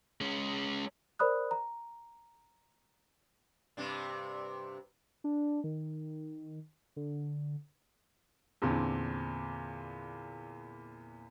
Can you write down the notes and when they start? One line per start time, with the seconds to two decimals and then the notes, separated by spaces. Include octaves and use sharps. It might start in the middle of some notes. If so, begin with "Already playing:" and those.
0.21 G#3 C#4
1.19 A#4 C5 D5 B5 D#6 F#6
1.51 A#5
3.77 G2 C3 D4
5.24 D4
5.64 D#3
6.96 D3
8.62 E2 A#2 D3 C4